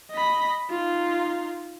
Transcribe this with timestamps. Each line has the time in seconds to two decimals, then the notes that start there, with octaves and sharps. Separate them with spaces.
0.11 D#5 B5
0.70 D#4 F4